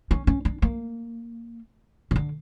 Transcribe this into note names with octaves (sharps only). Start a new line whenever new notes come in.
C#4
C#4
D4
A#3
C#3
D3